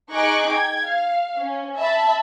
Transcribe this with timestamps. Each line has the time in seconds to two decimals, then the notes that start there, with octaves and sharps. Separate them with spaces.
0.11 D#4 G#4 C#6 D6 F#6 D7
0.50 G5 G#6
0.85 F5
1.37 C#4
1.76 E5 A5 B5